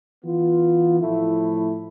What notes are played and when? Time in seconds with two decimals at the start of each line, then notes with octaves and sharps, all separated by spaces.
0.23 E3 B3 F4
1.00 A2 F3 A3 E4